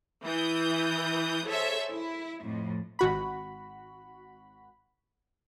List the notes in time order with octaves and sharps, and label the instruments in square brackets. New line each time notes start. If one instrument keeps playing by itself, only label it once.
[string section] E3 E4 D#6 G6
G#4 A4 C5 C#5 E5
E4
F2 A2
[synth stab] G#1 F#4 B5